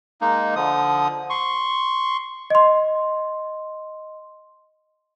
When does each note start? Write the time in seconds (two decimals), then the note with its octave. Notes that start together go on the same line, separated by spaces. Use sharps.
0.21 G#3 A#3 D#4
0.56 D3 F3 D#6
1.30 C6 C#6
2.50 D#5 C6